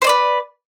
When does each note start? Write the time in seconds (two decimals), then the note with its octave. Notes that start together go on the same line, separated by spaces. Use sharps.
0.02 C5
0.04 D#5
0.07 D5
0.09 B4